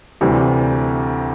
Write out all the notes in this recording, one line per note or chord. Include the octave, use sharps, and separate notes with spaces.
D2 C3 E3 G3